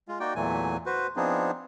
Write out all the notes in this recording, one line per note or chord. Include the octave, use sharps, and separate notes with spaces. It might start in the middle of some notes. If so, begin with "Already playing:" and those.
G#3 F4
A#3 D#4 F#4 D5 G5
E2 A#2 E3 F#3 A3 G#5
F#4 B4 C5
F3 B3 C4 D4 D#4 G#4